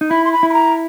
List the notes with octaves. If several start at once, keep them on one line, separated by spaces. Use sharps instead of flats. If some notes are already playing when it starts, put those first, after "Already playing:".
D#4
E4 B5
C6
B5
E4
B5
A#5